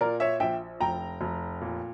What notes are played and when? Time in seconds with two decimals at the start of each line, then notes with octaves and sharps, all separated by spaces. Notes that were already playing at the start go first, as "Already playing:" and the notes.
0.01 A#2 A#4 D5
0.20 C#5 E5
0.40 A#1 E5 G5
0.80 F1 G5 A#5
1.21 F1
1.61 A#2